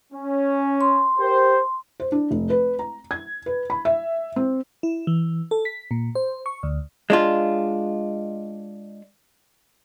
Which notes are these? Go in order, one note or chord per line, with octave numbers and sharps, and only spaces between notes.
C#4
C6
G4 A#4 C5
C5
D4
F1
B4
A#5
G#6
B4
B5
E5
C4
E4
E3
A4
B6
A#2
C5
C#6
D2
G#3 D4 F4